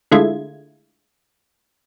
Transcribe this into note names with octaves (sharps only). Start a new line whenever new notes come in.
D3 G#3 A3 E4 F4 G#6